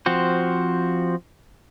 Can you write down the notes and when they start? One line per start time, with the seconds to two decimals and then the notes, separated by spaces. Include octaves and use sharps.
0.06 F3 C4 F#4 C5